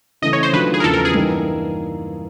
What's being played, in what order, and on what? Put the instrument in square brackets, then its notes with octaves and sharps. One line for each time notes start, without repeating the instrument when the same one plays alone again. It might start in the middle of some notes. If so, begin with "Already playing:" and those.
[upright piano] C#3 E3 A3 [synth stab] D#5
[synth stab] C#5
C5
[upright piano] D#3 F#3 A3 D4 F4 [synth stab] B4
[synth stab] G#4
A#4
[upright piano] E2 C#3 F3 A3 [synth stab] A4
[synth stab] A#4
G#4
[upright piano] G2 E3 G3 A#3 D#4